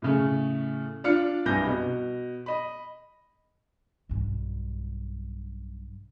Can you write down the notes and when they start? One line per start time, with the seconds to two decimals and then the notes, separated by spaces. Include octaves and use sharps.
0.02 A2 C#3 A3
1.04 D4 F4 F5 F6 C#7
1.46 C2 G2 G3 G#5 G6 A#6
1.66 B2
2.46 D#5 B5
4.09 B1 G2